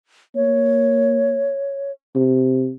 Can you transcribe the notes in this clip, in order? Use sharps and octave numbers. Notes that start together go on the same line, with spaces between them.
A#3 C#5
C3